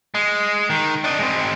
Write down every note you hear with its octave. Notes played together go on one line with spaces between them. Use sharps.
G#3
D#3
D4 D#5
G#3 C4